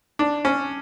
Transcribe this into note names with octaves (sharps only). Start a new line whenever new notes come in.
D4
C#4